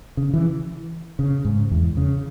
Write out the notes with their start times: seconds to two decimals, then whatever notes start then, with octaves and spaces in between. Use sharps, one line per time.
0.17 C#3
0.34 E3
1.19 C#3
1.45 G#2
1.71 E2
1.97 C#3